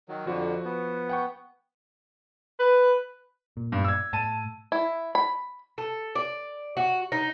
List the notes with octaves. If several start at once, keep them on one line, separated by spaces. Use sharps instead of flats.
D#3 F#3
F2 D3 F3 F#4
B3
F#5 G5 C#6
B4
A#2
G2
E6 G#6
A2 A5 D#7
E4
B5
A4
D5
F#4
D#4